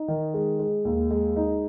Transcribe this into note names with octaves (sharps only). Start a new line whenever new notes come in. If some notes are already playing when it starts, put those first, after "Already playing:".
Already playing: D#4
D#3
G#3
G#3
D#2
G#3
D#4